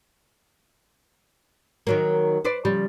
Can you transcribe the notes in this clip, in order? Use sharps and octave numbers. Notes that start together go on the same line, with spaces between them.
D#3 F#3 A#3
B4 C5 D5
C#3 F3 G3